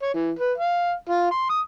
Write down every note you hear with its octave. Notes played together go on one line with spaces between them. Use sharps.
C#5
E3
B4
F5
F4
C6
D#6